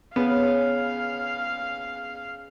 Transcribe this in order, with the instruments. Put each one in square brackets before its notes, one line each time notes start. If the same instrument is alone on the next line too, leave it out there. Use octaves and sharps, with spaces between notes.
[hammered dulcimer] C#3 [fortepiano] B3 [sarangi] F5